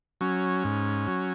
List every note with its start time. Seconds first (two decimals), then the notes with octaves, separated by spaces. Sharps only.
0.21 F#3 C#4
0.64 G#2
1.07 F#3